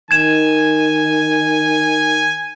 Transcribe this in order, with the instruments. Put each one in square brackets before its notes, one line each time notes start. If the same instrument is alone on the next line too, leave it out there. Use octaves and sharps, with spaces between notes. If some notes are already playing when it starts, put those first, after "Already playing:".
[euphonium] D#3 [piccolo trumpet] G#5 [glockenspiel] G#6 E7